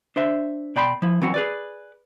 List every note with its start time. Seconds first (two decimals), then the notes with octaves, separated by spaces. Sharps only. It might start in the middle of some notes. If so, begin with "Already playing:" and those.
0.16 D4 C5 E5
0.76 B2 D5 G5 B5 C6
1.02 F3 E4
1.22 E3 F#3 C4 C#4 F#4
1.34 G#4 B4 D5